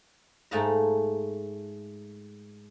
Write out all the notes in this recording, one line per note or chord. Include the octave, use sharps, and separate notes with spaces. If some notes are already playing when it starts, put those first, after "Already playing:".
G#2 A3 F5 F#5 A5 A#5